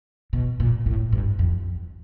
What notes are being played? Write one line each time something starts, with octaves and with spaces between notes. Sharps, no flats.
B2
A#2
A2
G2
F2